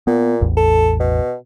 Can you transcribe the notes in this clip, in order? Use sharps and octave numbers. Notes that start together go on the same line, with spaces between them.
A#2 B3
A1 E2
A4
B2